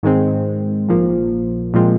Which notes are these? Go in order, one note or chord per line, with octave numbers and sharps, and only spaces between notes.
G#2 D#3 G#3 C4
A#1 A#2 F3 A#3
A#2 F3 G#3 C4 F4